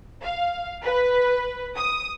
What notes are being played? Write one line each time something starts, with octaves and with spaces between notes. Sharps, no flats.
F5
B4
D#6